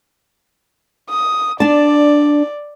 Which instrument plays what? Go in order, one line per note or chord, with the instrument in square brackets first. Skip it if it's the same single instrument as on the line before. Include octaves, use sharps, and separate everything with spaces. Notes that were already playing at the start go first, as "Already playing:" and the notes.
[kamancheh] D#6
[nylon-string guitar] D4 A5 [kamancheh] D5